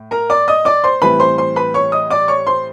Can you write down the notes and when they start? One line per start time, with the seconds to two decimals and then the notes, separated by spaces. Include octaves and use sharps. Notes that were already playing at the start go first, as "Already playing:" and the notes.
Already playing: A2
0.11 A#4 A#5
0.30 D5 D6
0.48 D#5 D#6
0.65 D5 D6
0.84 C5 C6
1.02 A2 E3 G3 C4 B4 B5
1.20 C5 C6
1.38 C5 C6
1.56 B4 B5
1.74 C#5 C#6
1.92 D#5 D#6
2.10 D5 D6
2.28 C#5 C#6
2.47 C5 C6